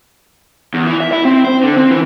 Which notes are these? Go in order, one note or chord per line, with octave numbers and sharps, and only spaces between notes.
E2
E3
E5
E4
C4
C5
D3
C4
E3